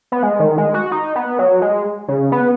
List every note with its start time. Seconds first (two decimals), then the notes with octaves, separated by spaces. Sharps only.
0.12 B3
0.23 G#3
0.40 D#3
0.58 G#3
0.74 F#4
0.92 D#4
1.16 B3
1.39 F#3
1.62 G#3
2.08 C#3
2.32 B3